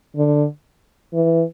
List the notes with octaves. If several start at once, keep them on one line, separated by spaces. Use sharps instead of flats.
D3
E3